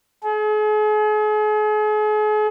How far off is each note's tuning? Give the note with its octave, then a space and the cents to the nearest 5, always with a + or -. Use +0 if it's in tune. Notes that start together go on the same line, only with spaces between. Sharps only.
G#4 +40